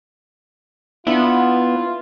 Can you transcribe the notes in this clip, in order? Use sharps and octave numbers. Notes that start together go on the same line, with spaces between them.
B3 D4 E4 F4